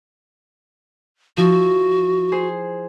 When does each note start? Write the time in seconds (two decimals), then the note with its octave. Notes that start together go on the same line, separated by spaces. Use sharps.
1.37 F3 E4 F#4
2.32 G#4 C5